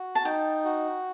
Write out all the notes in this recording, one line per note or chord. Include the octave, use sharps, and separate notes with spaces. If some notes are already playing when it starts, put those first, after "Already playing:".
Already playing: F#4
A5
D#4 G5
F#4